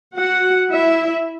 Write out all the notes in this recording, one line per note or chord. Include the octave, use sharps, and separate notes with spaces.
F#4 F#5
E4 E5